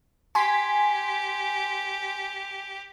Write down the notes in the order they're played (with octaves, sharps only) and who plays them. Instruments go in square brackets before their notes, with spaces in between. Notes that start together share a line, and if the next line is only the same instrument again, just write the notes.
[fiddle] G4 [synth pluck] G#5 C6 B6